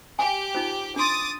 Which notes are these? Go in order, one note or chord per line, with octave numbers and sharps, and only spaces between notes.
G4 G#5
D#4 F4 C5
D4 C6 D6 D#6 A6